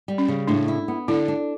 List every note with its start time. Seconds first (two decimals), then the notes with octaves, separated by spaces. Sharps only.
0.08 G3
0.18 C#4
0.28 C#3
0.47 A2 D4
0.68 E4
0.88 B3
1.08 D3 E4
1.28 D4